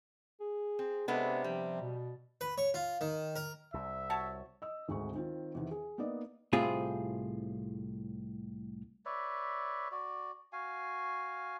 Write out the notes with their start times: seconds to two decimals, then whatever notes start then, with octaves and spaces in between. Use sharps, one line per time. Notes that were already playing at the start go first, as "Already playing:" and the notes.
0.40 G#4
0.79 C4
1.08 C3 G#3 B3 D4 A4
1.44 F3 G3
1.81 B2
2.41 B4
2.58 C#5
2.74 F4
3.01 D#3
3.36 A#4
3.74 C2 C3 E5
4.10 F#4 C#5 A5
4.62 D#5 E6
4.88 G#1 D2 G#3 C4 C#6
5.14 D#3 C4 F4
5.54 E2 C3 D#3 E3
5.71 G#4
5.98 A#3 B3 D#4 D5 D#5
6.53 C2 A2 C3 C4 F4 G#4
9.05 B4 C#5 D5 E5
9.92 F#4 D5
10.53 F#4 F5 G#5